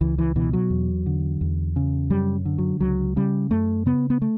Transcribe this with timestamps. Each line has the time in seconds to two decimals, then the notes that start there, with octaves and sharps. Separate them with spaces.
0.01 C#2 E3
0.18 E3
0.36 B2 E3
0.53 F#3
0.70 E2
1.06 D3
1.41 E2
1.76 C#3
2.10 F#2 G3
2.45 D3
2.58 F#3
2.81 C#2 F#3
3.16 C#3 G3
3.51 F#2 A3
3.86 C#3 B3
4.10 B3
4.22 A3